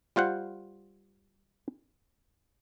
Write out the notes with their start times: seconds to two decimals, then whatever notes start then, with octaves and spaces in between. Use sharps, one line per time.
0.16 G3 F4 C5 F#5